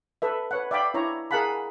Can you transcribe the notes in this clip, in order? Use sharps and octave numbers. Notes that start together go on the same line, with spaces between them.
A4 B4 E5
B4 C#5 F#5
D5 E5 F5 G5 B5 D6
D4 E4 C#5 A#5
G#4 A#4 F5 F#5 A5 B5